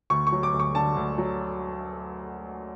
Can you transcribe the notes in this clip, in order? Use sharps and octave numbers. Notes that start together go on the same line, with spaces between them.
D2 C#6
C#6
F#3
D6
D2
C#6
D3 A5
D2
F#3